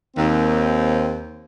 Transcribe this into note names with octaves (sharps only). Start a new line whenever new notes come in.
D#2 C4